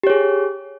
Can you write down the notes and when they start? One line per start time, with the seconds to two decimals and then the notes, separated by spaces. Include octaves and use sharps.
0.03 G4
0.07 C#5
0.10 G#4